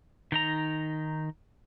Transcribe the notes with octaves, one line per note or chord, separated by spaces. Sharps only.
D#3 D#4 A#5